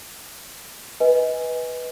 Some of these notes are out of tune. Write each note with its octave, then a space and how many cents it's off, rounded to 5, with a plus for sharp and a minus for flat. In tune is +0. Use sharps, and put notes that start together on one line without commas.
B4 -5 D#5 +25 G#5 +0